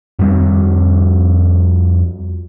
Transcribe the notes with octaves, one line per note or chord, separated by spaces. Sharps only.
F2 G3 C4